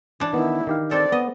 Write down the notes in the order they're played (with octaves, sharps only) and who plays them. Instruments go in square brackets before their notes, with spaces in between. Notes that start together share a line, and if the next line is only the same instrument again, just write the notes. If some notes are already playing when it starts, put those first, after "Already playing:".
[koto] E3 D4
[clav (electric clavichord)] D#3 B3 [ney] E4
[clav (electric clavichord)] D#3 G4 F5
[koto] C4 A4 [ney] D5
[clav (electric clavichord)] B3 [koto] D#5